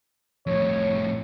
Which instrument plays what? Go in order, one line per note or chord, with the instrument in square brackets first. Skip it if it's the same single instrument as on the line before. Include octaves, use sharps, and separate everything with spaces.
[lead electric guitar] F2 A2 [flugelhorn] C#5